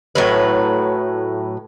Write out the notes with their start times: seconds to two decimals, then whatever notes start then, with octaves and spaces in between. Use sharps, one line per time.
0.15 A2 F#3 B4